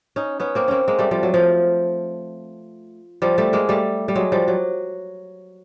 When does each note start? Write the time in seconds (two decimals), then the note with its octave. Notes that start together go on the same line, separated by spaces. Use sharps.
0.16 C#4 D#4
0.40 B3 C#4
0.55 A#3 C4
0.68 A#3 C4 C#4
0.88 G#3 A#3
0.99 G3 A3
1.11 F3 G3
1.23 F#3
1.34 F3
3.22 F3 G3
3.38 G3 A3
3.53 G#3 A#3
3.69 G3 A3
4.08 G3
4.15 F#3 G#3
4.32 F3 G3
4.48 F#3